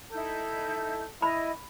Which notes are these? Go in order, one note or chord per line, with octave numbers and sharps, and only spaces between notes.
D#4 E4 A4 G6
E4 D#5 B5